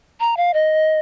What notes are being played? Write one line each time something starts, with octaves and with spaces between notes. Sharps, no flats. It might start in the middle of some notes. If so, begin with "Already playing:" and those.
A#5
F5
D#5